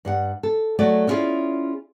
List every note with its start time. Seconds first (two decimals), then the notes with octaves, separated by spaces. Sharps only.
0.05 G2 G3 F#5
0.43 A4
0.79 F#3 A3 F#4 G#4 D5
1.07 B3 C#4 E4 F4 G#4 D5